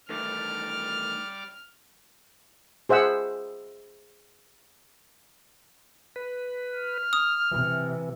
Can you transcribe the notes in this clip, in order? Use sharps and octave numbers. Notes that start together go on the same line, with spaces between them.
D#3 E3 G3 A3 D6 F6
G#4 C5 E5 F#5 E6
B4
F6
D#6
C3 E3